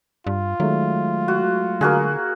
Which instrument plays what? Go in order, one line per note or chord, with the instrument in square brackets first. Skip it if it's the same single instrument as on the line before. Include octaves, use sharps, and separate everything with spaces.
[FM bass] G2 [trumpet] F4
[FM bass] D#3 [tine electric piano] F#3 G#3 A3
[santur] F#4
[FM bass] D3 [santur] A#3 F#4 G#4